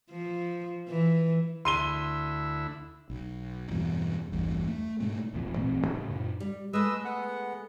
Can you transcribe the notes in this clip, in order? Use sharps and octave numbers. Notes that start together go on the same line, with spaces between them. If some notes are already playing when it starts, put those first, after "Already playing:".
F3
E3
D2 E4 C6 D#7 G7
B1
E2 G2 B2
A1 E2 G2
A3
G#2 B2 G#3 A3
D#1 B1 F2 F3
A1 A#2 A3 C4
A2 C#3
F#2 A#2
G3
G#3 A3 B4 D#5 E6
B3 F#5